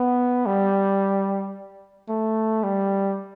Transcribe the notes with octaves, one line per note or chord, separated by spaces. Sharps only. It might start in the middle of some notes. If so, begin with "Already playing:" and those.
Already playing: B3
G3
A3
G3